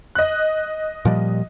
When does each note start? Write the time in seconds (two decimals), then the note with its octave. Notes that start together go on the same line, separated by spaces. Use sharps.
0.15 D#5 F#6
1.05 A#2 F3 G3